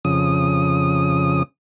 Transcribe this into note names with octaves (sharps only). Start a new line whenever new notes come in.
F2 C#3 D#6